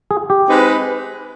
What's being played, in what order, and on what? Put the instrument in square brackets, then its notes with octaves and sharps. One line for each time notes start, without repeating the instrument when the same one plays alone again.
[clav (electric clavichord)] G#4
G4
[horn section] G#3 C4 D#4 B4